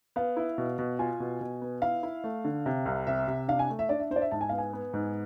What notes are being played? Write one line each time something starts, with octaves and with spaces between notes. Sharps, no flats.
B3 F5
E4
B2
B2
F4 G#5
B2
B2
B3
E4 F5
E4
A3
D3
C3
C2
C3 E5
C3
D4 F5
G#5
A3
E5
D4 D5
E5
D4 C5
D5
E5
G#2 A5
G#5
B3 F5
G#5
B3
G#2